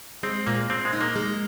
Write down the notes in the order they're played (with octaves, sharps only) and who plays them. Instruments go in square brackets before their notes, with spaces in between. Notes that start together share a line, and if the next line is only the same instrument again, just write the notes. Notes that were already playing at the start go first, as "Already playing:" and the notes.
[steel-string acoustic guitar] G#3 [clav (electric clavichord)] C4
[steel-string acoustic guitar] A#2 [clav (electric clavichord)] A#3
[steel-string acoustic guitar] A#2 [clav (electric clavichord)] C4
[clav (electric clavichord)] G#3
[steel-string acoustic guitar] D#4
[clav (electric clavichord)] A#3
[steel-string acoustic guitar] G#3